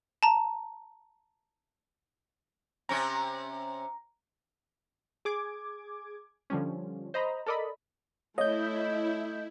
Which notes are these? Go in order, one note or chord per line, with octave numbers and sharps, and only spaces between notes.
A5 A#5
C3 C#4 C#5 A#5
G#4 D6 G#6
D3 F3 G3 C#4
C5 D#5 A#5 B5
A4 A#4 D5 D#5 B5
A3 E4 C#5 D#5 G6